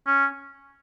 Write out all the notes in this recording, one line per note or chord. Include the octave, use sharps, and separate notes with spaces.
C#4